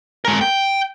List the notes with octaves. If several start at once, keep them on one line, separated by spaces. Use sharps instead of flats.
G#3 A#4
G5